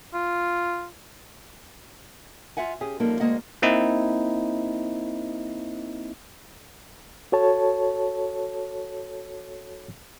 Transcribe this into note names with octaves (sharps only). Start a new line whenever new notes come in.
F4
F4 E5 F#5 G#5
C#4 G4 G#4
F#2 F3 G3 A#3 D#4 A4
D2 F#3 G#3 A#3 D#5 F#5
A#3 C4 D#4 E4
F#4 A4 C#5 A5